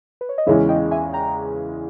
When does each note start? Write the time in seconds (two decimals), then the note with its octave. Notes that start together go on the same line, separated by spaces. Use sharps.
0.21 B4
0.29 C#5
0.38 D#5
0.46 E2 C#3 E3 G#3 C#4 C#5 E5
0.69 D#5 G5
0.91 E5 G#5
1.13 G5 A#5